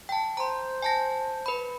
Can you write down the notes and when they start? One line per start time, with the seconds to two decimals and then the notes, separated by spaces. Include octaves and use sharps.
0.09 G5 A5
0.37 C5 A#5 C6
0.82 G#5 A5 A#6
1.46 B4 B5